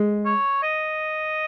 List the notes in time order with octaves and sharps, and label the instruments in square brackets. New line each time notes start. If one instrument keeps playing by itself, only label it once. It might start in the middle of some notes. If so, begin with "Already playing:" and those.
Already playing: [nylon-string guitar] G#3
[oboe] C#5
D#5